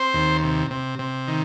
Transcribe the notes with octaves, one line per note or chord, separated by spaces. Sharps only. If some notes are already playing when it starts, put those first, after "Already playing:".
Already playing: C4 C5
D#2
C3
C3
C3
D#3